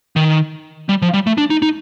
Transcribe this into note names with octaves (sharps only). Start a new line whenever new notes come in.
D#3
G3
F3
G3
A3
D4
D#4
D#4